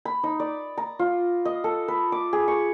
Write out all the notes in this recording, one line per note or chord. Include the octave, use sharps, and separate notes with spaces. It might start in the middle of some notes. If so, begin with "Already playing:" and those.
B5
D#4
D5
A#5
F4
D#5
A4
B4
D6
G#4
C#6